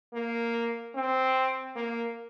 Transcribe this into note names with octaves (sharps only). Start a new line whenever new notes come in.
A#3
C4
A#3